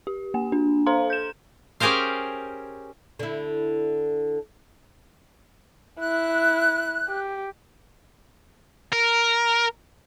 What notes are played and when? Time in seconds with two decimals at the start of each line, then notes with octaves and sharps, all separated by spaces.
0.07 G4
0.34 A#3 G#5
0.52 D4
0.86 A4 C5 F5 A#5 C6
1.10 G6 E7
1.80 C#4 G4 G#4 A#4 C5 F5
3.19 D3 E4
6.00 E4 F#6
7.08 G4
8.93 A#4